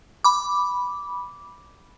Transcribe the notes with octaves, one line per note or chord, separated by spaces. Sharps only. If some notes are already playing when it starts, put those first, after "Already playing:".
B5 D6